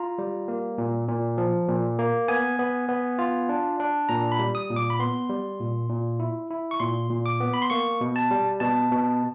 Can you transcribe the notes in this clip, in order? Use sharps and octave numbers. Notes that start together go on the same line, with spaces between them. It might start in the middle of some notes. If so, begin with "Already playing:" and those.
Already playing: F4 A#5
G3
A#3
A#2
A#2
F3
A#2
A#3
B3 G#5
B3
B3
F4
D4
D4
A#2 A#5
B5
G3
D#6
A#2
D6
B5
B3 C6
G3
A#2
A#2
E4
E4
C#6
A#2 C6
A#2
D6
B3
B5
C6
A#3 C#6
B2
A5
G3
B2 A5
B2